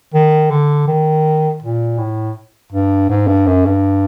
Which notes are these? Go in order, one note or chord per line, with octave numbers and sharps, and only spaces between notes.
D#3
D3
D#3
A#2
A2
G2
G#2
G2
F#2
G2